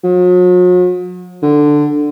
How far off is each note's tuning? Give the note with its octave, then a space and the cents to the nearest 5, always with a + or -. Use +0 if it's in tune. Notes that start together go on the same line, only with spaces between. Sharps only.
F#3 -45
D3 +5